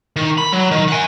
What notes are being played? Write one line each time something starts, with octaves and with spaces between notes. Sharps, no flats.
D#3
B5
F#3
D#3
F#5 G#5